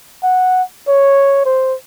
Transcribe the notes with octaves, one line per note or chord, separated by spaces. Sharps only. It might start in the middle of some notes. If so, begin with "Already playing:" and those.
F#5
C#5
C5